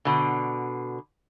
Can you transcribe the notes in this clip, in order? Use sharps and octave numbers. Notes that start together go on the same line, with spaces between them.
B2 D3